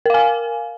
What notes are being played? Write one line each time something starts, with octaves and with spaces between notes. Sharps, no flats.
A#4 F5 G#5